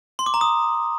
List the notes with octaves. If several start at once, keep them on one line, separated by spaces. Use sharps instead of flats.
C6
D6
A#5
D#6